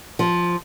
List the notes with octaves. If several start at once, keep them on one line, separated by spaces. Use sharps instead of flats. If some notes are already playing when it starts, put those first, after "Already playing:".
F3